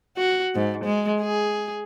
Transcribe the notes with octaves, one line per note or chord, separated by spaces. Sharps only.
F#4
G#2
G#3
G#4